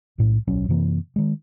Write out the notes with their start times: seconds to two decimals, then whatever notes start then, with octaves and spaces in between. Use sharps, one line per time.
0.18 B1 A2
0.47 D1 B1 F#3 C#4
0.68 F#2 C3 E3 A#3
1.16 D#3 G#3